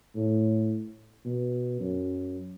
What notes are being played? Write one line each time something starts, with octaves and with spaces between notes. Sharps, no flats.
A2
B2
F#2